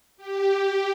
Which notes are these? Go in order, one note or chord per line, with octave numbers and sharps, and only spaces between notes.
G4